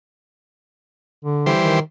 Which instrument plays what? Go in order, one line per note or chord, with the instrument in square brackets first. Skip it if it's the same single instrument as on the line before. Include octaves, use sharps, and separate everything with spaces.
[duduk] D3
[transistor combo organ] E3 G3 C5
[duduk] D#3